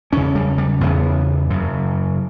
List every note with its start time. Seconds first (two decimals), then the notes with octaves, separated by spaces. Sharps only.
0.12 E2 C#4
0.17 C#3
0.35 G3
0.58 G3
0.81 E2 C#3 B3
1.50 F#2 C#3